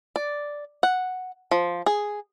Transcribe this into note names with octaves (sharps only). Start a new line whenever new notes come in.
D5
F#5
F3
G#4